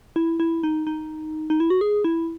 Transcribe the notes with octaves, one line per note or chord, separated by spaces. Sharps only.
E4
E4
D#4
D#4
D#4
E4
F#4
G#4
E4